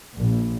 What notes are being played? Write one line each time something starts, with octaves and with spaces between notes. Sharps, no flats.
A#1